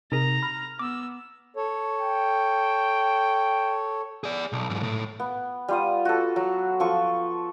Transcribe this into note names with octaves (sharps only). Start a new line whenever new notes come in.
C3 D#4 G#4 A#4 A#5
B5 F6
B3 D6 E6
A4 C#5
G5
G#4 D5
B1
B1 G#2
A2
B3
G3 F4 D#6
F#4 A4
F#3
F3 A4 C#6